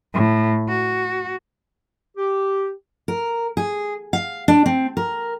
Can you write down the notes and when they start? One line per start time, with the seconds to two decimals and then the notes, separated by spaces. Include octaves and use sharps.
0.14 A2
0.69 F#4
2.17 G4
3.08 A#4
3.57 G#4
4.13 F5
4.48 D4
4.66 C4
4.97 A#4